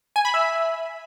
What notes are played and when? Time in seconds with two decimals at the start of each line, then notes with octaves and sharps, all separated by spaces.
0.16 G#5
0.25 B5
0.34 E5